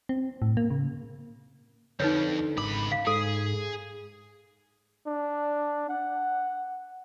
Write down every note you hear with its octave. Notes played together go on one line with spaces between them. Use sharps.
C4
A2
A#3
C#3
F2 D3 D#4 B4 C#5
G#1 C#2 B5 D6
F5
G#2 G#4 A4
D4
F#5